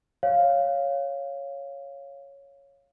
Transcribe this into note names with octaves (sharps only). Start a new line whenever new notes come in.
C#5 F5